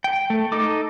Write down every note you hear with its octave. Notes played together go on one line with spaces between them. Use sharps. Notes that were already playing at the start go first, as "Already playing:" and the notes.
G5
A3
D#4 A4 D6